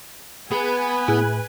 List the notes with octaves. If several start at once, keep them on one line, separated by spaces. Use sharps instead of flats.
B3 G#4 B4 G#5
A2 E4 G#4 F#6